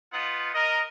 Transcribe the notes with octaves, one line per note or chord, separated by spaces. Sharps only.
B3 D#4 F4 F#5
A#4 D#5